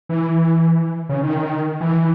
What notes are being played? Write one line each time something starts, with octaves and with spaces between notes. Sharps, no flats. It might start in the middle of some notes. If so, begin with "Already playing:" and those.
E3
C#3
D#3
E3